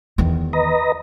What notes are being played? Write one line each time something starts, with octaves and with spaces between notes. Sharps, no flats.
E2 D#3
B4 D#5 A#5